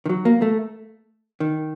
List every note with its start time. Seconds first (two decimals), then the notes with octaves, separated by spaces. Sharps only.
0.06 D#3
0.09 F#3
0.25 A#3
0.42 A3
1.40 D#3